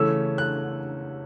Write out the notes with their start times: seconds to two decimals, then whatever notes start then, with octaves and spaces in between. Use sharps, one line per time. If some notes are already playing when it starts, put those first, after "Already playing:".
Already playing: C#3 E3 A3 C#4 E6
0.38 F#6